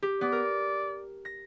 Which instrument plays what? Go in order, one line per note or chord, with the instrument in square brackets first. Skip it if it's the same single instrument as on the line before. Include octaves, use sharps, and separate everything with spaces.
[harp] G4
[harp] B3 [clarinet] D5
[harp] A#4
A#6